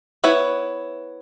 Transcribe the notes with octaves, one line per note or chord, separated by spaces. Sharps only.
B3 E4 B4 C#5